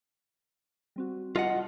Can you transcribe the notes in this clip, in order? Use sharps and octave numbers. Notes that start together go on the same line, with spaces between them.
G3 C4 F#4
G3 F4 D#5 F#5 A5